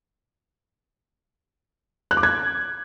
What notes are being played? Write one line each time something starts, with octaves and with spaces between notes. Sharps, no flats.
F#6
D6
G#6